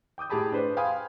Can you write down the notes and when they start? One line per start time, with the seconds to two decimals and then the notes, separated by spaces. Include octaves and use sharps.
0.18 G5 D6 D#6 G6
0.30 A2 G4 G#4 A5 B5 D#6
0.52 D4 B4 C5 D5
0.77 F5 G5 G#5 B5 C6 D#6